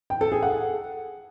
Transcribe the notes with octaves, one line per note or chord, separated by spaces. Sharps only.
G5
A4
G#4
F#5